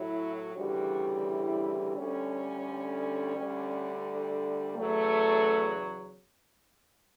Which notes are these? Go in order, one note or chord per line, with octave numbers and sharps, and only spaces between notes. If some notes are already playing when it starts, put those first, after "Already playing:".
Already playing: A2 F#3 E4
D2 C#3 E3 G3 F#4
E4
D2 D3 G3 C#4
D2 D3 G3
E2 C#3 F#3 A3